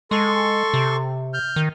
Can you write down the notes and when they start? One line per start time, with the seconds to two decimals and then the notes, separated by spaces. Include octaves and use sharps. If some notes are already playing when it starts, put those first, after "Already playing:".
0.11 G#3 A4 C6 C#6
0.74 C3
1.34 F6 G6
1.56 D#3